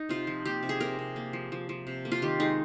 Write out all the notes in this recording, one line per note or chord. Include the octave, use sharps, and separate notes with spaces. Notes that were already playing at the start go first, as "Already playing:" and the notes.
Already playing: D#4
C3 F4
F3
A#3 G4
C3
G#4
C3 A#4
C3
A#3
F3
F3
F3
C3
A#3
F4
D#3 G4
G#3 D#4